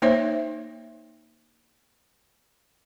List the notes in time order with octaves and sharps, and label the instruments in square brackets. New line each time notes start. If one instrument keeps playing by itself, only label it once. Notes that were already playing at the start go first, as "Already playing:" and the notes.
[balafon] A#3 D#4 C5 C#5 E5